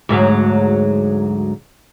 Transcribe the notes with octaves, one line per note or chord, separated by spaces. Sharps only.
D2 G#2 F#3